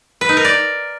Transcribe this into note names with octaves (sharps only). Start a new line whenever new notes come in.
B4
D#4
A#4
D5